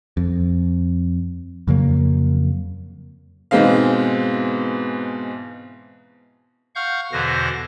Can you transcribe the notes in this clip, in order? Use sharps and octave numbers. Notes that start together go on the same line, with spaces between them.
F2
F2 C#3 F#3 A#3
G#2 B2 E3 G#3 C4 F5
F5 F#5 C#6 F6 G6
E2 B2 D3 E3 C5 A#6